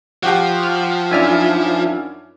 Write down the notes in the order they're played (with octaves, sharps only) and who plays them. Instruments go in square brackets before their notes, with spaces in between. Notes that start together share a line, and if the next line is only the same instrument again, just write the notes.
[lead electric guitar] F3 [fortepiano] F#4 G4 G5
[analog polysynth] F6
[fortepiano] F#2 D5 [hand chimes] D4 D#4 F4 [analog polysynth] E5 G#5 F6